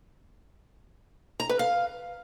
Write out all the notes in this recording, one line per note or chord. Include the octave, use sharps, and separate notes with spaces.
A#5
B4
F5